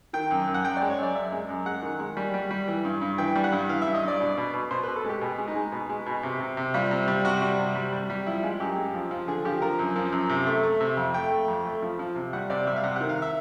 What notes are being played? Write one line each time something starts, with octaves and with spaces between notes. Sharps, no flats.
D#3 G5
F#2
F#2
F#5
F#2 G5
D5
G#3
C#5
F#2 D5
F#2 E5
G#3
F#2
G#3 F#5
D#3
G#3
G3
G3
G3
E3
G2
G2
E3 G5
G3
F#5
G2
E3 F5
E5
G2
D#5
G2 D5
B2
B2
B2
B2 C5
B4
B2
A4
G#3 G4
B2
G#3
D#4
G#3
B2
G#3
B2
C3
C3
C3
G3 F4
C3
G3
C3 F#4
G3
C3
G3
G3
G3
F3 E4
G#3 F4
F#2 G4
G#3
F3
F3
D3 G#4
F3 G4
F3 A#4
F#2
F3
F#2
C3
A3
A3
C3 E5
F2
A3 G5
A3
F2
A3
F3
F3
C3
G3 F#5
C3 D5
G3 E5
F5
C3 F#5
F#5
D#3
F5
E5